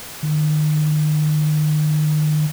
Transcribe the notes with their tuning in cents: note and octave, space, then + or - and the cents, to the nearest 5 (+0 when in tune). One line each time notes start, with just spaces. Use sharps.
D#3 -35